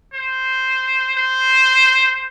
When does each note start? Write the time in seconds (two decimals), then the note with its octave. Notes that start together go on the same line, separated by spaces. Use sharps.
0.14 C5
1.17 C5